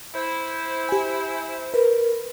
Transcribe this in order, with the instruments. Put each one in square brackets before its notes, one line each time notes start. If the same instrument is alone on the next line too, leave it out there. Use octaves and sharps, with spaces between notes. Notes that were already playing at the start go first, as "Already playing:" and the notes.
[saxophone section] E4 C5
[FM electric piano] G4 G#5
[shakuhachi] A#4 [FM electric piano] B4